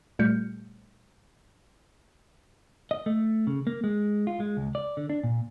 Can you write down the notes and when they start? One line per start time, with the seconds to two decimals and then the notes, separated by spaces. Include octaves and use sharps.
0.19 A#2 G3 A3 F6 G6 C#7
2.91 D#5
3.06 A3
3.47 C#3
3.67 A#3
3.84 G#3
4.27 F4
4.40 G#3
4.57 C#2
4.75 D5
4.97 D3
5.10 D4
5.24 A#2